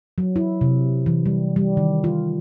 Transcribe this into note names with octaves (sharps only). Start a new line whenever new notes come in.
F#3
E4
C3
E3
G3
G3
D#3
F4